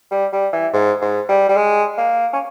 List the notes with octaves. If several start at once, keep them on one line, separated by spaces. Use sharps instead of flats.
G3
G3
E3
G#2
G#2
G3
G3
G#3
A#3
C#4